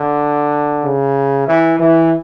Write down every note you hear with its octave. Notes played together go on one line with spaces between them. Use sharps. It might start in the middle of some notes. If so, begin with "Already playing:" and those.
Already playing: D3
C#3
E3
E3